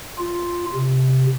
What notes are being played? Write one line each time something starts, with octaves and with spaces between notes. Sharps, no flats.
F4
C3